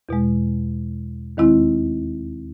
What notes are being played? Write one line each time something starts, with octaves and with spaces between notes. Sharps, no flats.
E2 B2 G#3
D#2 D#3 G#3 C4 E4